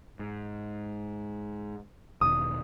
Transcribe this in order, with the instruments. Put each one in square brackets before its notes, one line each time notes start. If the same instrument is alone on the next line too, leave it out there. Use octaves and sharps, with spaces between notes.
[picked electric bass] G#2
[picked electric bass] E1 B2 D#3 [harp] D#6